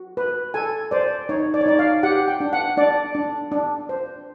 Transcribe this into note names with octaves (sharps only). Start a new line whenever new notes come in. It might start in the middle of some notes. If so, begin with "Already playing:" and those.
Already playing: F#4
B4
A4 G#5
C5 D5
D#4 C#5
D5
C#5
D#4 D5
F5
G4 F#5
G5
D4
F#5
D4 D5
D4
D4
C5